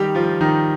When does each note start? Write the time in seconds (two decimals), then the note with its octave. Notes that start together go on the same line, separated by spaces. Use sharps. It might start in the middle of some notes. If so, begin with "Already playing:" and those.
Already playing: D#3 G3 D#4 G4
0.15 F3 F4
0.41 D#3 D#4